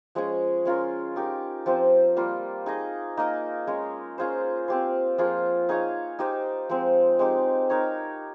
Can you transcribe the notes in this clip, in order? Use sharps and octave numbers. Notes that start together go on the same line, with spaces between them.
F3 G#3 C#4 G#4
G#3 C#4 F4 A#4
D#4 G4 A#4
F3 C4 G4 C5
G3 A#3 F4
D#4 G#4 D#5
A#3 D#4 A#4 D#5
G#3 C#4 F4
C#4 F4 G#4 C5
C4 G4 C5
F3 A#3 F4 G#4
D#4 G#4 C#5 F5
D#4 G4 C5 D#5
F3 G#3 C4
G#3 C4 D#4 G4
D#4 A#4 C#5